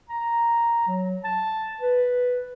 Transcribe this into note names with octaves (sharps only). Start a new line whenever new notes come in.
A#5
F#3
A5
B4